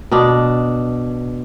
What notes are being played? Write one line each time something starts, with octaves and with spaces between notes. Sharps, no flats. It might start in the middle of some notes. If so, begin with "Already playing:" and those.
B2 D4